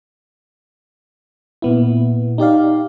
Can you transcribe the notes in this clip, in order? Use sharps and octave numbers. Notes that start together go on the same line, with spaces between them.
A#2 B3 E4
D#4 G4 D5 F5